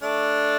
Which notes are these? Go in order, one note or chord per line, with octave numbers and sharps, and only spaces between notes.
A3 D4